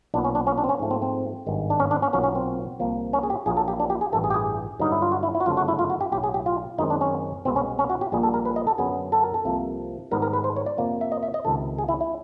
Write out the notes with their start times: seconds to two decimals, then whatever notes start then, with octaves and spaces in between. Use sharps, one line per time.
0.14 B1 A#2 F#3 B3 D4
0.24 C#4
0.35 D4
0.47 C#4
0.58 D4
0.64 C4
0.69 C#4
0.79 G#2 F3 A3 C4
0.91 C4
1.02 C4
1.46 G#1 G2 D#3 G#3
1.70 D4
1.80 C#4
1.91 D4
2.02 C#4
2.13 B1 A#2 F#3 A#3 C#4
2.24 C#4
2.35 C4
2.79 C2 A#2 F3 A#3
3.13 C#4
3.23 G#4
3.30 G4
3.46 A#1 A#2 F#3 A#3 G#4
3.57 A4
3.68 G4
3.80 D4
3.90 G4
4.01 G#4
4.12 A1 G2 E3 A4
4.24 G#4
4.30 G4
4.34 G#4
4.79 G2 D3 F#3 D#4
4.92 E4
5.02 F4
5.12 F#4
5.23 E4
5.35 E4
5.40 F#4
5.46 G1 F#2 C#3 F3 A3 F4
5.57 F#4
5.68 E4
5.79 F4
5.90 F#4
6.01 G4
6.12 B1 A2 F#3 G4
6.23 G#4
6.34 G4
6.46 F4
6.78 F#2 D#3 G#3 C4 D#4
6.90 D4
7.01 C#4
7.45 C2 B2 G#3 B3 C4
7.56 C#4
7.79 C#4
7.90 F#4
8.01 G4
8.12 A#1 A#2 G3 A#3 G#4
8.23 A4
8.34 A#4
8.45 B4
8.56 D#5
8.67 A4
8.78 F#2 D3 F#3 B3 G#4
9.12 A4
9.23 A#4
9.34 A4
9.45 C2 C3 F3 A#3
10.11 G#2 D#3 G3 B3 A#4
10.22 A#4
10.33 B4
10.44 C5
10.56 C#5
10.66 D5
10.77 F2 C3 F3 A#3
11.01 E5
11.12 D#5
11.23 E5
11.34 D#5
11.45 C#2 C3 D#3 A4
11.78 G#4
11.89 E4
12.01 E4